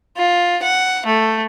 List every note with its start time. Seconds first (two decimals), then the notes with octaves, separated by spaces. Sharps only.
0.17 F4
0.62 F#5
1.06 A3